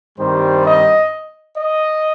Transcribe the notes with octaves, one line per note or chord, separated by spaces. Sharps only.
G2 D#3 G3 C4 C5
D#5
D#5